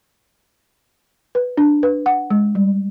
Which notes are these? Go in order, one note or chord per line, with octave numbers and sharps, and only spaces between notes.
B4
D4
B4
F#5
G#3
G3